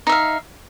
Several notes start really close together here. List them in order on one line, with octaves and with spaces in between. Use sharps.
D#4 E5 F5